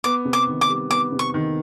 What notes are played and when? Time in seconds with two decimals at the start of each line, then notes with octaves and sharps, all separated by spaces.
0.04 B3 D6
0.25 C3
0.33 D6
0.47 D#3
0.61 D6
0.69 G3
0.90 B3 D6
1.12 C3
1.19 C#6
1.34 D#3